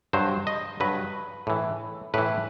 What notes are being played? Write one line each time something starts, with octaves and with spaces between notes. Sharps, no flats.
G2 F#3 C5
D#5
G2 F#3 B4
A2 E3
A2 E3 B4